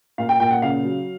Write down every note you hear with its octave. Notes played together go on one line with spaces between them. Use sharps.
A#2 F5
G5
A#2 G5
F#5
C#3 F5
F#3